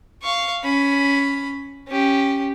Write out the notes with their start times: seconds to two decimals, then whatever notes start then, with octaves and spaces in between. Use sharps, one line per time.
0.23 F5 C#6
0.64 C#4 B5
1.88 C#4 G4